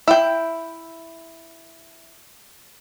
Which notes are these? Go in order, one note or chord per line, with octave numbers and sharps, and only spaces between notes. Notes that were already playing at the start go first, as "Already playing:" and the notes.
E4 G5